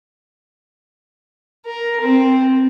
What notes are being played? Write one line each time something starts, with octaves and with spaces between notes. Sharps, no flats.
A#4
C4